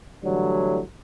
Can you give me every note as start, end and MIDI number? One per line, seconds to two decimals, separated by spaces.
0.24 0.79 45
0.24 0.79 50
0.24 0.79 52
0.24 0.79 54
0.24 0.79 55